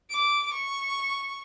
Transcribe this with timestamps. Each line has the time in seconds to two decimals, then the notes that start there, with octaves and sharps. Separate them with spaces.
0.11 D6
0.54 C#6